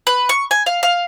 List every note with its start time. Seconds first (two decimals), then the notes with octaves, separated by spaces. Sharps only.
0.07 B4
0.29 C#6
0.51 G#5
0.66 F5
0.83 F5